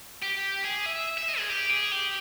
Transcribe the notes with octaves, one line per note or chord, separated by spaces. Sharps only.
G4
G#4
E5
E5
D#5
G#4
G4
G#4
G4